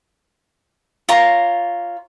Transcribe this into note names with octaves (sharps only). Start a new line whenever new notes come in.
F4 C#5 A#5